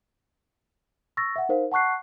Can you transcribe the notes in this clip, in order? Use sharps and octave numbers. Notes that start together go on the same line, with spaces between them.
C#6 E6 A6 A#6
E5 F#5
D#4 A#4 C5 F5
F#5 A5 C#6 F#6 C7